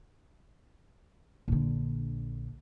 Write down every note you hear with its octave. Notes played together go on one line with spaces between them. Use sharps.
A#1 D3